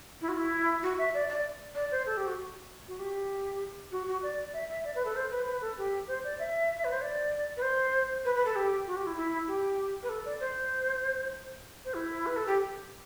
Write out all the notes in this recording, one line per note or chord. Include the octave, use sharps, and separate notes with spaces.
E4
F#4
E4
F#4
E5
D5
D5
D5
C5
A4
G4
F#4
F#4
G4
F#4
F#4
D5
E5
E5
D5
B4
A4
C5
B4
B4
A4
G4
C5
D5
E5
B4
C5
D5
B4
C5
B4
B4
A4
G4
F#4
G4
E4
E4
G4
B4
A4
D5
C5
C5
E4
B4
A4
G4